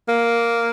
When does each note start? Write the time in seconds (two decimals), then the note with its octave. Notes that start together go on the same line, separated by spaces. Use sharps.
0.09 A#3